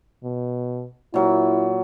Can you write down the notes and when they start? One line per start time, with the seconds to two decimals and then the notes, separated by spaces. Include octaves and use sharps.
0.24 B2
1.14 A#2 F#3 E4 A#4